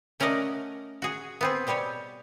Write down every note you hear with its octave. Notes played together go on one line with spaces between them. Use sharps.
A3 C#4 A#4 D5 D#5 F#5
F#4 G#4
B3 C4 G#4
B2 G3 G4 C#5 G#5